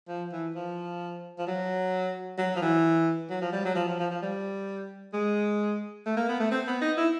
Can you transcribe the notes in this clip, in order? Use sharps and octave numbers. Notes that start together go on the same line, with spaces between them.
F3
E3
F3
F3
F#3
F#3
F3
E3
F#3
F3
G3
F#3
F3
F3
F3
F3
G3
G#3
A3
A#3
B3
A3
C4
B3
D#4
E4